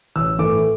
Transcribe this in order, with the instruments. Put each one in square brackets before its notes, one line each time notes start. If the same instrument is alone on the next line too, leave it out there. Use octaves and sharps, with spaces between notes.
[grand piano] A1 E6
A2 E3 A3 D6